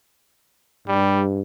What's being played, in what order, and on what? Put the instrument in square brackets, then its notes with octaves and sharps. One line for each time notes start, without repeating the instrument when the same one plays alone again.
[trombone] G2 [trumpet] G3